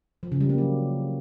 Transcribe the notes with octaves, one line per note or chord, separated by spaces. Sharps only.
F3
C#3
G3
A#3
F#3